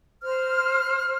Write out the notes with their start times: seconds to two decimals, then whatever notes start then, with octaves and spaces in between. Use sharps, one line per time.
0.22 C5 F6